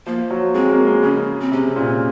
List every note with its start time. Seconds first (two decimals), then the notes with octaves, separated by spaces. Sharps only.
0.07 F3 A#3
0.30 F#3
0.54 G#3 C4
0.71 A#3
0.87 G#3
1.03 C#3 C#4
1.41 C4
1.51 C3 C#4
1.76 A#2